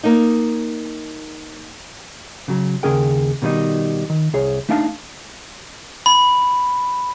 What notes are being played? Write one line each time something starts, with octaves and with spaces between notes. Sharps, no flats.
A#3 D#4
C#3 F#3
D#2 C#3 C#4 G#4 A#4 G5
B2 D#3 G3 C4 D#4
D#3
C2 G#4 C#5
A3 D4 D#4 F5 F#5 A5
B5